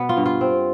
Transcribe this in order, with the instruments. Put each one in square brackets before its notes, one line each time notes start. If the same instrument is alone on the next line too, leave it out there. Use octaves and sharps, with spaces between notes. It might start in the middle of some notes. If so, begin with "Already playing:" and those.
Already playing: [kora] B2 B3
F4
G2
F4
C4